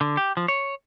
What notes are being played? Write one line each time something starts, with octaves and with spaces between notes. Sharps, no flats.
D3
G4
F3
C#5